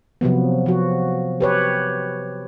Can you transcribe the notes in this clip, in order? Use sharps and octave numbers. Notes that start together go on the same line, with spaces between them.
C3 F3 F#3 B3
F3 F#4
G4 B4 C#5